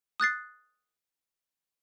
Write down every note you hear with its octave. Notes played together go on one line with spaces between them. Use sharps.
D#6 F#6 A6 C7